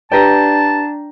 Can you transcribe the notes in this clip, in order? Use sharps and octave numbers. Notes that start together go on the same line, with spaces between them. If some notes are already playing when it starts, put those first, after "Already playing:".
D4 G4 B4 D5 G5 A5 A#5